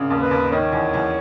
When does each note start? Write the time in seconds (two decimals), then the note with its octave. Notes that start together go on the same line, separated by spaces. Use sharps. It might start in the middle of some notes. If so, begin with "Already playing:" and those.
Already playing: G#1 C#3
0.10 D#2
0.20 B4
0.31 D#2
0.52 D#3 C#5
0.72 E2
0.94 E2